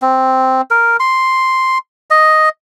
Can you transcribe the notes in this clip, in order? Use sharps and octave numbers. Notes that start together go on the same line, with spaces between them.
C4
A#4
C6
D#5